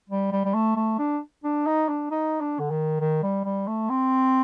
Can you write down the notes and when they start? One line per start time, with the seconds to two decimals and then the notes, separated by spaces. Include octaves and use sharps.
0.10 G3
0.32 G3
0.45 G3
0.54 A3
0.76 A3
0.99 D4
1.44 D4
1.66 D#4
1.88 D4
2.11 D#4
2.41 D4
2.59 D3
2.71 D#3
3.00 D#3
3.23 G3
3.45 G3
3.67 A3
3.90 C4